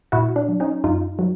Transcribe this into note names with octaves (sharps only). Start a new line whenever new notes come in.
A#2 E4 F#4
D4
F#3
C#4 D#4
F#2 D#4 F4
F#3